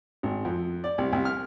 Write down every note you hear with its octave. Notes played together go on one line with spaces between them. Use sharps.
G#1
F2
D5
C2
C2
F6